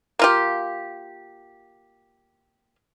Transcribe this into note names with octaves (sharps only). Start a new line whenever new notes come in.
A#3 F4 G4